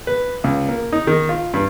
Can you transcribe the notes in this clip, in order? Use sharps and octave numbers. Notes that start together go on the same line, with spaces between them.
B4
C#2
A#3
D#4
D#3
F4
G2